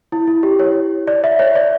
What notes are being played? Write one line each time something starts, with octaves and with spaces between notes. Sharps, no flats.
E4
E4
G4
C#5
D5
E5
C#5
D5